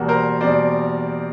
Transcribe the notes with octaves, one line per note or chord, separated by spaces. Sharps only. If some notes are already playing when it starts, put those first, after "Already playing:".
Already playing: E2 B2 G3 A#3 F#4
A#4 C5
E2 B2 G3 A#3 C5 D5